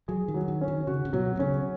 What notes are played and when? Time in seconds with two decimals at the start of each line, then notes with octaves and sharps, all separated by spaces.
0.08 F#3 G#4
0.28 D#3
0.34 F#3
0.48 D#3
0.61 C#4
0.68 D#3
0.87 C#3 F#4
1.05 C#3
1.13 B2 F#3
1.36 B2
1.39 C#3 C#4